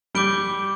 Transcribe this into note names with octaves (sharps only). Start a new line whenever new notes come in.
G3 D6 G6 D7 G7